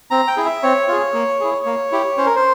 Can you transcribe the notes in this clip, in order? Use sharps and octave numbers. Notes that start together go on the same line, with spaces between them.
C4 A#5
G5
E4 G#4
E5
C4 C#5
F4 G#4
A#3
E4 G#4
A#3
E4 G4
C#4 C5
A#4
C5